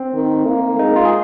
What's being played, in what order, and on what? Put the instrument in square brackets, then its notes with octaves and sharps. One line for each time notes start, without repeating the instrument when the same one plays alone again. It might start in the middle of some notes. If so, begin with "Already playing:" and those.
Already playing: [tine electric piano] C4
[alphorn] D#3
A#3
[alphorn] G#3 [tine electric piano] D#4
[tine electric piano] F4
G#4